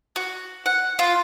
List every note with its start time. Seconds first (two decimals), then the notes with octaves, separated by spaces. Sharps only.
0.16 F#4
0.66 F#5
0.99 F4